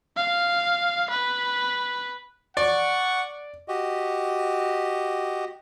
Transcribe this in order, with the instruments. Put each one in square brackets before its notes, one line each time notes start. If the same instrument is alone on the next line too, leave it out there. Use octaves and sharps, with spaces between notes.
[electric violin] F5
B4
[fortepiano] D5 [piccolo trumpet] F#5 [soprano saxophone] C#6
[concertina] F#4 G4 D#5